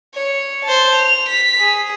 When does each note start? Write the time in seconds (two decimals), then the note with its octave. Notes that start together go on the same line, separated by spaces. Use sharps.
0.15 C#5
0.65 C5 A5
0.96 F7
1.29 B6
1.60 G#4